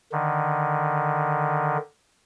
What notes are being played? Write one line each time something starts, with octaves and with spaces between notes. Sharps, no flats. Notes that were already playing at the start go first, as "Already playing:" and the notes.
D3 D#3